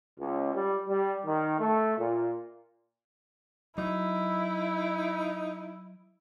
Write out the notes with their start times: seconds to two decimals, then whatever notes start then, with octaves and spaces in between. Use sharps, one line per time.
0.19 C#2
0.53 G3
0.87 G3
1.25 D#3
1.59 A3
1.96 A#2
3.78 F#3 D#4 E4